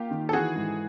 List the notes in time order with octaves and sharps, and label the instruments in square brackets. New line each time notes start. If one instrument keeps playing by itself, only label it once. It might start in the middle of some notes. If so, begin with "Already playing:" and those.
Already playing: [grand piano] A#3 [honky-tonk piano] F4 G4
[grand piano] D#3
[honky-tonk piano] A4
[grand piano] E3 [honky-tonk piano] F#4 G#4
[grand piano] G#2